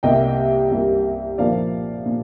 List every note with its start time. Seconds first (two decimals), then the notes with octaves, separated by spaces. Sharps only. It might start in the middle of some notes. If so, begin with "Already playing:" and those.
0.03 C2 C3 G3 A#3 D#5 G5
0.71 C2 C3 G3 A#3
1.38 A#2 F3 A#3 D5 F5
2.06 A#2